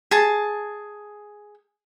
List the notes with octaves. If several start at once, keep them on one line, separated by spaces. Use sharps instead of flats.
G#4 A5